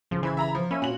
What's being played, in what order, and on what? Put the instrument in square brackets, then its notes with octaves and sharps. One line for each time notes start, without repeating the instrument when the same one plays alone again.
[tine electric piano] A1 C#3 [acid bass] F3
[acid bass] E3 [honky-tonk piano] C5 B5 G#6
[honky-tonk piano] E5 A#5 B5
F3
[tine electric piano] A#3 E5 G#5 [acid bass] C#4 [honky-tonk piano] B5
[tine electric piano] A#2 F4 [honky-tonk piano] F#4 F#7